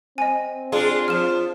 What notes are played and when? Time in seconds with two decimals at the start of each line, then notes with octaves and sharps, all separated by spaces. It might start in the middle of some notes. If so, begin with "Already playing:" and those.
0.18 C4 D#5 G#5
0.72 G#3 D4 F4 G#4
1.08 F3 F6 E7